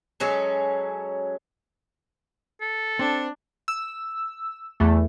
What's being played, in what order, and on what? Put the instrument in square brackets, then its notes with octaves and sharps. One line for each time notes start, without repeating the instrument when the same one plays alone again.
[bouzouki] F#3 G#3 C#4 A4
[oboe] A4
[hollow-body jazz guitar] C4 [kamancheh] D4
[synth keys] E6
E2 A3